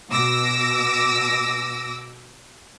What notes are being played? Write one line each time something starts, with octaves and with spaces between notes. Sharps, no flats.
B2 D6 E6 A#6